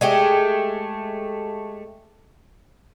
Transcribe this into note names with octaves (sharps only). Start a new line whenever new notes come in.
G#3 A3 G4